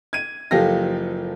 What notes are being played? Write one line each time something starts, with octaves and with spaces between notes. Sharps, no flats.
G#6 D#7
F#1 F3 G4 A4 F5 A#6